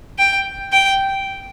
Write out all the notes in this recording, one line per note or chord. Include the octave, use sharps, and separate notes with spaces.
G5
G5